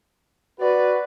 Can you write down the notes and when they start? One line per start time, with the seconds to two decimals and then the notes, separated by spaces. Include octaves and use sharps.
0.61 F#4 B4 D5